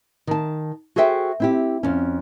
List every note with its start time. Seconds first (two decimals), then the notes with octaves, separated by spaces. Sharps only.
0.27 D#3 A5
0.96 F#4 G#4 A4 C5 E5 G5
1.40 C4 E4 G4
1.83 F2 C#4